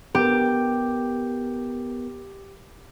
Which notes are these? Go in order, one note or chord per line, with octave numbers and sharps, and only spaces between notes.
B3 G4 A#4